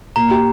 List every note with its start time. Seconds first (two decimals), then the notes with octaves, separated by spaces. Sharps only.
0.16 A#2 A#5
0.31 G4